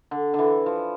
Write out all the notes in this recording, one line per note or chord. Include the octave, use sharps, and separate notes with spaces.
D3
D3
E3
F3